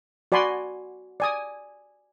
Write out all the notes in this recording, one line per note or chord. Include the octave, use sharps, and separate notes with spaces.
F#4 D5 G#5 B5 C6
D5 G#5 D#6